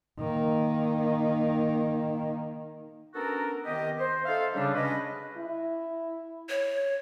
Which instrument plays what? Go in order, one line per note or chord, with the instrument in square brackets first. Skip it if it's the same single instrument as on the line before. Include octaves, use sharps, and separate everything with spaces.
[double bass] D#3 A#3
[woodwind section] B3 C#4 D4 F#4 A4 A#4
C2 D#3 B3 G4 D#5
C5
D#4 A4 E5 F5
C#3 G3 D4
G#3 C#4 D4 F#4 B4 D#5
[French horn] E4
[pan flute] C#5